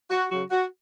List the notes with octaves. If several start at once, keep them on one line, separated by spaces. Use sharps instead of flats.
F#4
C#3 F#3 F#4
F#4